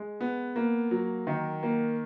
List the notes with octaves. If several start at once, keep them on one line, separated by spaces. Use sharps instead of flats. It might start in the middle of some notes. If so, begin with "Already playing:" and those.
Already playing: G#3
B3
A#3
F#3
D#3
A#3